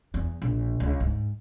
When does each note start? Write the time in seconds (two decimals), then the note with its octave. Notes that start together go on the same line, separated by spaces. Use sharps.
0.14 E2
0.42 A#1
0.80 C#2
1.00 G#2